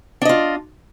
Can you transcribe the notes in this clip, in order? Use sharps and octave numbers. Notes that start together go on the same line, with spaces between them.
D4 F4 D#5